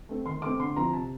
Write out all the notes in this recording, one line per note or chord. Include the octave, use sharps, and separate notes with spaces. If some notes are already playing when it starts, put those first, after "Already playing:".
A3 C4
D#3 C6
A3 C4 D6
D3 C6
F3 C4 A#5
C3 A5